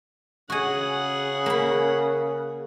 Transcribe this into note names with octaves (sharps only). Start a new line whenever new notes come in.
C#3 F#4 G#4 F#5 G#5
A#3 B5